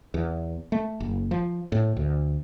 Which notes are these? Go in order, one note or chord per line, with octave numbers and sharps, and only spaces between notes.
E2
A3
F#1
F3
A2
D2